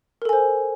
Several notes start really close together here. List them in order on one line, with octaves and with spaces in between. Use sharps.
A#4 A4 G#5 C5